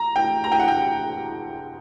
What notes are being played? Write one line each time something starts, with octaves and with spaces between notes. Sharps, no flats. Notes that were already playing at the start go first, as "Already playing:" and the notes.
Already playing: A#5
G5
A#5
G5
F#5
G5